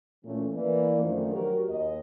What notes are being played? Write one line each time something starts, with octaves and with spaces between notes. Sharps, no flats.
A#2 E3 A3 C#4
E3 A#3 D5
F#2 D#3 F3 A3 D4 C5
F#3 F#4 G4 A#4
D#2 D#5